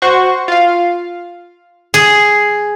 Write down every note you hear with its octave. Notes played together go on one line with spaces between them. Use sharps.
F#4 C5 C#6
F4 F5
G#4